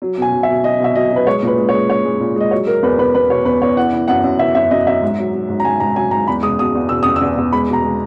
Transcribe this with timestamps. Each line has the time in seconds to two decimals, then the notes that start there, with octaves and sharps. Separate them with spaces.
0.02 F#3
0.18 B2 G#5
0.32 F#3
0.43 E5
0.48 B2
0.64 F#3 D#5
0.80 B2 E5
0.95 F#3 D#5
1.11 F#3
1.16 B4
1.27 G#3 C#5
1.42 A#2
1.47 B4
1.58 G#3
1.69 C#5
1.74 G#3
1.89 G#3 C#5
2.05 G#3
2.20 A#2
2.36 G#3 D#5
2.51 F#3 C#5
2.67 F#3 A#4
2.83 E2 B4
2.98 E2 B4
3.15 E2 B4
3.30 B2 C#5
3.45 E2 B4
3.62 E2 C#5
3.77 E3 F#5
3.93 E3
4.08 F#2 F#5
4.24 F#2
4.39 E3 E5
4.55 F#2 E5
4.71 F#2 D#5
4.87 F#2 E5
5.02 G#2
5.18 F#3
5.33 F#3
5.49 G#2
5.60 A#5
5.65 G#2 G#5
5.80 G#2 A#5
5.96 F#3 G#5
6.11 G#2 A#5
6.27 E2 B5
6.43 G#3 D#6
6.59 B2 D#6
6.75 E2
6.89 B2 E6
7.03 E2 D#6
7.16 E6
7.21 E2
7.38 E2
7.52 G#3 B5
7.68 B2
7.73 A#5
7.84 G#3